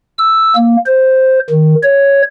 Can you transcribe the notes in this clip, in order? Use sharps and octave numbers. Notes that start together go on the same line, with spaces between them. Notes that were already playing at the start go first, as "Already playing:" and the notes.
E6
A#3
C5
D#3
C#5